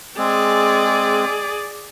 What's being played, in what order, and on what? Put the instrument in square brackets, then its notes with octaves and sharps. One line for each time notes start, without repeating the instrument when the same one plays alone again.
[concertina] G#3 C4 [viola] G#4 D5